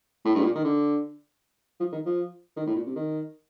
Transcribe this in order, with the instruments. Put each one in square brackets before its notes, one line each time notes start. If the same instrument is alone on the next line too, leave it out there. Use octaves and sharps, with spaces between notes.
[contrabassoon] A2
G2
A2
A#2
D#3
D3
F3
D#3
F3
D#3
A2
A#2
C3
D#3